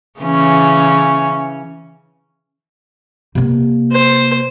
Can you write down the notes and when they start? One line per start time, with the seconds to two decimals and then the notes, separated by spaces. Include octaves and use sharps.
0.20 C#3 E3 C#4
3.35 C3 A#3
3.92 C5